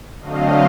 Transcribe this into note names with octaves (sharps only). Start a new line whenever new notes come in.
D3 F#3 A3 C4 D#5 F5